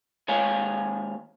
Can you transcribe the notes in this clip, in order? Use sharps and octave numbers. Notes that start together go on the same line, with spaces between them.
D#2 G#3 C#5 F5 G#5